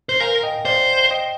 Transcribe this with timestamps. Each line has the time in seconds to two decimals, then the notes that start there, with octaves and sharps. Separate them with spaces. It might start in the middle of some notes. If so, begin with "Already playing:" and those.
0.09 C5
0.20 A#4 F5 G#5
0.43 D#5 G5
0.65 C5 D5 F5
1.11 D#5 G5